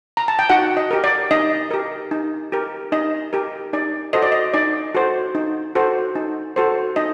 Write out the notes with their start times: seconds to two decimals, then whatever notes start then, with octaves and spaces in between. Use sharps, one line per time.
0.17 A#5
0.28 A5
0.39 G5
0.50 D#4 F#4 F#5
0.77 D#5
0.91 G4 A#4
1.04 D5
1.31 D#4 D#5
1.71 G4 A#4
2.11 D#4
2.52 G4 A#4
2.92 D#4 D#5
3.33 G4 A#4
3.73 D#4 D5
4.13 F#4 A4 C5 D#5
4.22 D5
4.32 D#5
4.54 D#4 D5
4.95 F#4 A4 C5
5.35 D#4
5.75 F#4 A4 C5
6.15 D#4
6.56 F#4 A4 C5
6.96 D#4 D#5